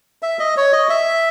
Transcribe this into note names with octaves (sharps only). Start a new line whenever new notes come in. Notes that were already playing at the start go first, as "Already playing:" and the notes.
E5
D#5
C#5
D#5
E5